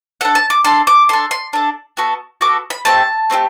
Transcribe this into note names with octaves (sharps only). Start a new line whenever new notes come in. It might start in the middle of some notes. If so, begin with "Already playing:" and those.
D4 A4 F#5
A5
D6
D4 A4 C6
D6
D4 A4 C6
C6
D4 A4
B3 F#4 A4
B3 F#4 A4 D6
B5
A3 C4 G4 A5
A3 C4 E4 G4